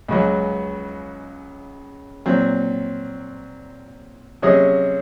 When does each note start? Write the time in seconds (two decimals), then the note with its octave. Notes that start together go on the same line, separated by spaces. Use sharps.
0.08 C#2 C#3 F#3
2.26 A#2 F#3 C4
4.42 C3 F#3 C#4 G#4 D#5